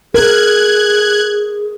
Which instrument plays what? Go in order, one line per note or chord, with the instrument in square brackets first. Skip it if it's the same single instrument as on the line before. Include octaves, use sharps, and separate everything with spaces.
[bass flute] G#4 [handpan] A#4 [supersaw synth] F#6 G#6